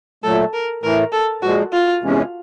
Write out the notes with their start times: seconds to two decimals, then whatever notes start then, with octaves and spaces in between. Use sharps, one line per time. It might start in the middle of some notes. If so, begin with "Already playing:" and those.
0.23 A#2 F#3 A3 A4
0.54 A#4
0.83 A2 E3 A3 A#4
1.12 A4
1.42 A#2 F3 G#3 F#4
1.73 F4
2.01 E2 C3 E3 G#3 C#4